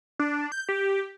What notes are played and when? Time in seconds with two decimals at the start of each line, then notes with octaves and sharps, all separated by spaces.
0.19 D4
0.52 G6
0.69 G4